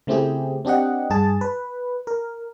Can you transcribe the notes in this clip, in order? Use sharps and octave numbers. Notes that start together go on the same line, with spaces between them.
C#3 A3 C4 E4 G4 G#4
C4 D4 G4 D#5 F#5
G2 G#4 A5
B4
A#4